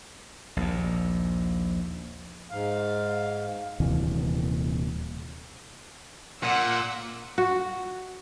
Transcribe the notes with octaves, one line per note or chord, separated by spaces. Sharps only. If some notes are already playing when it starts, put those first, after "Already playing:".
A#1 D#2
G#2 F5
D#1 D#2 C3 E3
A#2 F#5 E6
F#4